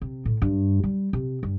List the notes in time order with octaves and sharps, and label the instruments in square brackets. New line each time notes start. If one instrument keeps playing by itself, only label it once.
[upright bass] C3
A2
G2
G3
C3
G2